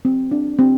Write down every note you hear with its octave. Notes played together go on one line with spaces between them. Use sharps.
C4
D4
C4